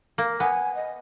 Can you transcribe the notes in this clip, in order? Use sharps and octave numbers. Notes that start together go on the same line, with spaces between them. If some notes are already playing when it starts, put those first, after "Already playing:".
A#3
B3 G#5
D#5